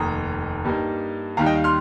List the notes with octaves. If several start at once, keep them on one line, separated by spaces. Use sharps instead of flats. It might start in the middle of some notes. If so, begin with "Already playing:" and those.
Already playing: F1 D#2 D#3 A#5 D#6
G2 G3 A#3 D#4
D#2 D#3 G3 F5 A#5
D#5 G5
F5
C6 F6